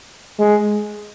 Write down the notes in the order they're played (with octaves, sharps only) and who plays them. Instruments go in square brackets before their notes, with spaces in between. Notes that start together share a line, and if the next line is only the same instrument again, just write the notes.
[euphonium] G#3